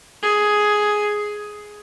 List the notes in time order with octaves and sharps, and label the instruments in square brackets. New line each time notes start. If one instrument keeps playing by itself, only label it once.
[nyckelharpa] G#4